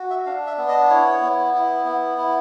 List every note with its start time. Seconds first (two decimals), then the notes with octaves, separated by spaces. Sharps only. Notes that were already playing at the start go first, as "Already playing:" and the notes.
Already playing: F#4
0.10 E5
0.26 D4 F5
0.47 E5
0.58 B3
0.68 D#5
0.89 E4 C#5
1.22 B3
1.54 E4
1.85 B3
2.18 E4